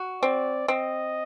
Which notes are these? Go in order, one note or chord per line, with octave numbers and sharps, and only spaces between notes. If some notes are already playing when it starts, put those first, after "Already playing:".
Already playing: F#4
C4 D5
C4 D#5